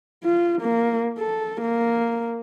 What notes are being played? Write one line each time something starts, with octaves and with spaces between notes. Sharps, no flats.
F4
A#3
A4
A#3